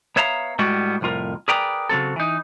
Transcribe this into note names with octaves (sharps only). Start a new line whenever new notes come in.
B3 C#5 E5 F5 A#5
A2 G3 G#3 B3 F#4
C2 F2 A2 F4 A#4
G#4 A#4 B4 D5 G5 A#5
C#3 F#3 C4 A4
E3 D#4